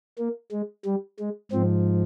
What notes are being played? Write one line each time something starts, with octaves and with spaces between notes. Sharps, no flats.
A#3
G#3
G3
G#3
G#2 F3 C4